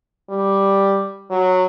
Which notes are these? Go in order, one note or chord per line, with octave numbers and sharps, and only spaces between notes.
G3
F#3